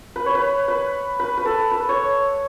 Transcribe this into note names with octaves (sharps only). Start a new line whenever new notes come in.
B4
C#5
B4
B4
B4
B4
A4
B4
C#5